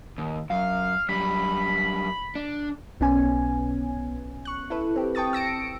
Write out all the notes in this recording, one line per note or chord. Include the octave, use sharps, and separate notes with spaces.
D#2
F#2 F5
F#2 G3 B5
D4
B1 B3 C#4 G#5
C#6 F#6
E4 A4 B4
C4 G4
G5 A5 C#6 D#6 A6
E6 A#6 C#7 D7